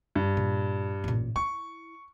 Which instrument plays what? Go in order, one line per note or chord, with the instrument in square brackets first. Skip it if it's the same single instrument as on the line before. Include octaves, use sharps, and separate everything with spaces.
[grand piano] G2
[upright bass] A#2
A1 A#2
[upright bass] E4 [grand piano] C#6